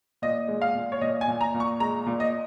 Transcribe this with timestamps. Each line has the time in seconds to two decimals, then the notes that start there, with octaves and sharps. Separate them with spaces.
0.22 A#2 D#5
0.48 G#3
0.62 F5
0.75 A#2
0.92 C#5
1.01 A#2 D#5
1.21 G#5
1.28 A#2
1.41 A#5
1.54 A#2
1.60 C#6
1.80 G#3 A#5
2.06 A#2
2.20 D#5